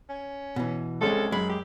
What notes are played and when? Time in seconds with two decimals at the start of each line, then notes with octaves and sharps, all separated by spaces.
0.09 C#4
0.56 B2 E3
1.01 C2 G#3 C#4 A4
1.32 F#2 G#3 B5
1.50 G4